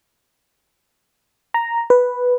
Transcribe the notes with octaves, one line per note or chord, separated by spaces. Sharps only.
A#5
B4